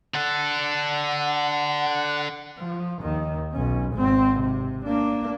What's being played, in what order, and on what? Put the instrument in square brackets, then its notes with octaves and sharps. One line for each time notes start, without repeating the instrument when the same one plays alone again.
[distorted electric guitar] D3 A4 [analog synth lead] F#5
[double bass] F3
D#2 D#3
B1 C#4
G#1 C4
C3
A#3 D4